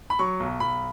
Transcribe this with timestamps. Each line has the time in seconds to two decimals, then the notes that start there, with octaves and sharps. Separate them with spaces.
0.10 B5
0.19 F#3 C#6
0.40 B1
0.60 B1 B5